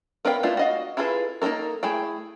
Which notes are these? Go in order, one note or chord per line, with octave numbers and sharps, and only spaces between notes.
B3 A#4 B4 F5 G5
A3 B3 D4 E4 F4
F#4 D#5 F5
E4 F4 G#4 A4 B4
A#3 D#4 F4 A4 A#4
A3 E4 G#4 G5